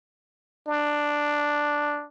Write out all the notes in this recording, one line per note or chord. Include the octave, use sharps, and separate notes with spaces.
D4